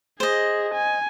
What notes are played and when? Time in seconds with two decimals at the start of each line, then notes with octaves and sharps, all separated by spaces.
0.20 G#4 C5 D#5
0.74 G#5